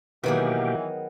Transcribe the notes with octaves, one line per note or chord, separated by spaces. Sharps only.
B2 D#3 E3 F#3 A#3 B3 G4 G#4